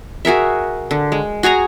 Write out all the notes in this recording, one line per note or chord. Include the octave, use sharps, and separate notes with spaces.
F#4 G#4 A#4 E5
D3
G#3
F#4 G#4 G#5 A#5